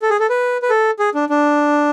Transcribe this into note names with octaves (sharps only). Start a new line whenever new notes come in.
A4
G#4
A4
B4
B4
A4
G#4
D4
D4